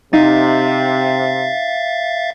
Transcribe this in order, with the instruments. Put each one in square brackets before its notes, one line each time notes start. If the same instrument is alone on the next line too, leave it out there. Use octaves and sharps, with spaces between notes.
[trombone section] C3 [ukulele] D#4 [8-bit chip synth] E5 F5 A6